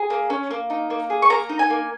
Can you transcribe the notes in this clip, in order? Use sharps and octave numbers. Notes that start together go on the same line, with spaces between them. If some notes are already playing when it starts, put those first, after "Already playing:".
Already playing: G#4
A#3
C#4
A#3
D#4
A#3
G#4
C#6
A#3 A#5
D#4
G#5
A#3